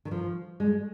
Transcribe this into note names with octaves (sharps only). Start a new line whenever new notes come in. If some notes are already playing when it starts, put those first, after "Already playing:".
D#3
F3
G#3